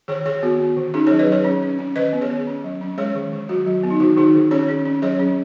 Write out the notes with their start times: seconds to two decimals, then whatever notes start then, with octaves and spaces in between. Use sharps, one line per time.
0.08 D#3 G#4 C#5
0.26 D#3 G#4 C#5
0.43 B3 F#4
0.60 B3
0.77 D#3
0.94 C#4 D#4 G#4
1.07 G#4 C#5
1.11 F#3
1.19 B4 D#5
1.27 F#3 G#4 C#5
1.45 C#4
1.62 C#4
1.79 C#4
1.96 D#3 B4 D#5
2.13 B3
2.21 G#4 C#5
2.30 B3
2.47 C#4
2.64 F#3
2.81 C#4
2.98 G#3 G#4 C#5
3.15 D#3
3.32 D#3
3.49 F#3 F#4
3.66 F#3
3.83 B3
3.90 D#4
4.00 D#3 F#4
4.17 D#3 D#4 G#4
4.34 D#3
4.51 C#4 G#4 C#5
4.69 C#4
4.86 C#4
5.02 F#3 G#4 C#5
5.19 C#4